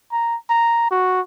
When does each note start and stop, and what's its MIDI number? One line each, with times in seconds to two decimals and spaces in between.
0.12 0.36 82
0.50 0.86 82
0.91 1.21 66